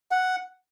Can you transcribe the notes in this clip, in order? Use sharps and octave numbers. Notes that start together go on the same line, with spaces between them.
F#5